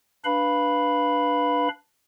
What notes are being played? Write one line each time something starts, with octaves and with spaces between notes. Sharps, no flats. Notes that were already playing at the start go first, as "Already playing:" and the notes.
D4 B4 F5 B5